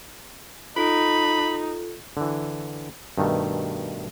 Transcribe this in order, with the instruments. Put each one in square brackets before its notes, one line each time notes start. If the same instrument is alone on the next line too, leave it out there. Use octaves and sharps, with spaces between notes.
[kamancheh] D#4 [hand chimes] F4 A4 [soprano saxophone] B5
[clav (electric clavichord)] D3 E3
G2 B2 D#3 A3